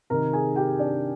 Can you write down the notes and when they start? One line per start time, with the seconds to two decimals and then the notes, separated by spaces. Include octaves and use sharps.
0.10 C3 D#3 A#4 A#5
0.33 G#4 G#5
0.56 G4 G5
0.79 D4 D5